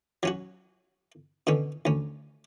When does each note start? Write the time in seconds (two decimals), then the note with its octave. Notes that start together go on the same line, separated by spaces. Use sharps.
0.23 F#3 C#4 F#4
1.47 B2 D3 C#4
1.85 D2 C#4